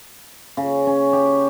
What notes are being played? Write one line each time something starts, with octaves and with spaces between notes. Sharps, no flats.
C#3
C#4
G4